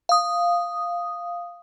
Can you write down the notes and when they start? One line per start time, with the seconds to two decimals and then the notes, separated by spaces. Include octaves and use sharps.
0.09 F5 D#6